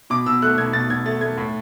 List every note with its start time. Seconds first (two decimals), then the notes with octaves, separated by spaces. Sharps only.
0.10 B2 D6
0.26 B2 E6
0.42 A3 F#6
0.58 B2 G#6
0.73 B2 A6
0.90 B2 G#6
1.05 A3 A6
1.21 A3 G#6
1.37 A2